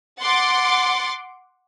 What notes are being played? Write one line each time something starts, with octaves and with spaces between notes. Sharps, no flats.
F#5 C6 D6 A6